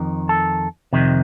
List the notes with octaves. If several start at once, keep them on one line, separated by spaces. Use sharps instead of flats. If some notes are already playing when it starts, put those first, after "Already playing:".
Already playing: F2 D#3
A4
F2 C3 D#3